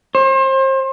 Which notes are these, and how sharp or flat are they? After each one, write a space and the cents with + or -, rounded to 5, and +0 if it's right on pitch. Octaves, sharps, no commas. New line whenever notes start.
C5 +35